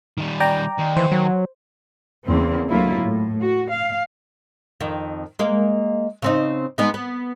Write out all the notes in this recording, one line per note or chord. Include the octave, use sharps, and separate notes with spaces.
D#3 G3
D5 G5 A#5
D#2
E3 C5
F#3
E2 C#3 A#3 C4
D2 F#3 A#3 E4 F4
A2
F#4
F5
F2 D#3
G#3 A#3 F5
C#3 C4 D#4
G#3 B3 D#4
B3